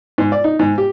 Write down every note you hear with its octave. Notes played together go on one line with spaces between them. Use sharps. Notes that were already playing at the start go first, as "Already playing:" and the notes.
G#2
D5
D#4
G#2
G4